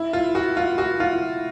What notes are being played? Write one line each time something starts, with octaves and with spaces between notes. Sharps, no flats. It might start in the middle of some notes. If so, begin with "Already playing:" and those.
Already playing: E4
F4
F#4
F4
F#4
F4